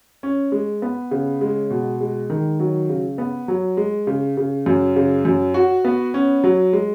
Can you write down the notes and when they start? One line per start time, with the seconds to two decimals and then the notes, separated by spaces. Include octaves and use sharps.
0.23 C#4
0.52 G#3
0.82 B3
1.11 C#3
1.41 G#3
1.70 B2
2.00 G#3
2.30 D#3
2.60 F#3
2.89 C#3
3.18 B3
3.48 F#3
3.77 G#3
4.07 C#3
4.37 C#3
4.66 F#2
4.96 C#3
5.25 F#2
5.54 F#4
5.85 B3
6.14 C#4
6.44 F#3
6.73 G#3